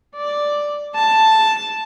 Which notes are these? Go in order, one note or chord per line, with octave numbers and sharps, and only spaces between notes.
D5
A5